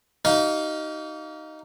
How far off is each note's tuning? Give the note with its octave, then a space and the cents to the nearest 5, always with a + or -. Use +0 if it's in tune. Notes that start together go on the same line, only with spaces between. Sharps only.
D#4 +0 G4 -45 F5 +0